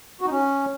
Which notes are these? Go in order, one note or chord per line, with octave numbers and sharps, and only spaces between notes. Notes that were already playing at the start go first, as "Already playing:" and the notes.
F#4
D#4
C#4